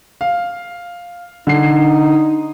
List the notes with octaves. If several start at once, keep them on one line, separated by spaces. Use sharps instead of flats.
F5
D3 D#4 C7